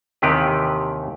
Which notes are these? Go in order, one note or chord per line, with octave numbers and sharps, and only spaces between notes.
D#2 C3 D#3 E3 G4 B4